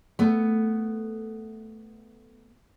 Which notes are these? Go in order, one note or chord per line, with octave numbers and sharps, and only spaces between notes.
A3 B3